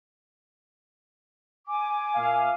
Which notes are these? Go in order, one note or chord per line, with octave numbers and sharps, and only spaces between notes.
G#5 D6
A#2 E5 F5